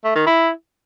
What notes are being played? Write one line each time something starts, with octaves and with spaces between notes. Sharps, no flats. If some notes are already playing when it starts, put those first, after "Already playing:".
A3
D#3
E4